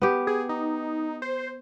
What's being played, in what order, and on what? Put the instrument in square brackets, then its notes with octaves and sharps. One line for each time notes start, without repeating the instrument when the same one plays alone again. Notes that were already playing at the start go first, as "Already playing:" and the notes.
[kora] B3 G4
[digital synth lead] G#4
D#4
C5